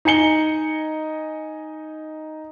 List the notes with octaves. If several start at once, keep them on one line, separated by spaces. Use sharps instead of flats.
D#4 D#5 G#5 C#7 G7